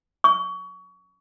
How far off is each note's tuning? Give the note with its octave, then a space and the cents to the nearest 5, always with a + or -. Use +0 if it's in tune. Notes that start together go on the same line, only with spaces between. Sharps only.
C#6 +25